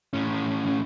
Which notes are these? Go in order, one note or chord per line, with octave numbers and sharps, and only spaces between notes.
A2 C#4